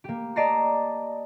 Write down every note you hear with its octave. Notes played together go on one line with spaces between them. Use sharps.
A#3 G4
D5 D#5 A5 A#5 A#6 C7